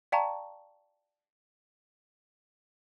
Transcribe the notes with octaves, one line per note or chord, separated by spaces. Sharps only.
D5 F5 G5 A5 A#5 C#6